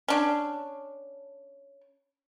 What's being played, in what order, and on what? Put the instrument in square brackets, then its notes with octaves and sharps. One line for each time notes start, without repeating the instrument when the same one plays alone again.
[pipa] C#4 D4